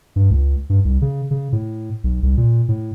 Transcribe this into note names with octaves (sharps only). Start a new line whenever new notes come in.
G2
C#2
G2
C2
C#3
C#3
A2
B1
C2
A#2
A2